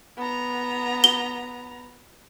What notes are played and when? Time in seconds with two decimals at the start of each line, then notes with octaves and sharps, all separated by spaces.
0.17 B3 A#5
1.04 G7